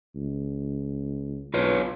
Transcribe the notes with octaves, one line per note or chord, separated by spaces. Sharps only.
C#2
B1 F4 B4 C#5